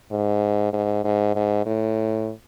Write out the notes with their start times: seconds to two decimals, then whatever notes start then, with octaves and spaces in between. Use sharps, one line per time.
0.11 G#2
0.73 G#2
1.04 G#2
1.35 G#2
1.66 A2